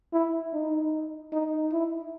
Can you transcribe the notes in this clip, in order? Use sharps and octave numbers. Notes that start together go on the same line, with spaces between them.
E4
D#4
D#4
E4